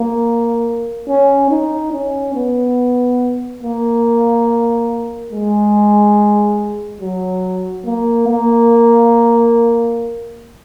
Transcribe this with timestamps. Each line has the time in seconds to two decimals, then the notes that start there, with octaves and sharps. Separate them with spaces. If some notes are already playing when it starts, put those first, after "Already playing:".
Already playing: A#3
1.09 C#4
1.51 D#4
1.92 C#4
2.35 B3
3.63 A#3
5.32 G#3
7.01 F#3
7.85 A#3
8.28 A#3